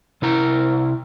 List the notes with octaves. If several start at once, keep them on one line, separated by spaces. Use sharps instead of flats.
C3 E4 A#5